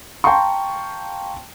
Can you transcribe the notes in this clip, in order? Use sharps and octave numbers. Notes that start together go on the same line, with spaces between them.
F5 G5 A5 A#5 C6 C#6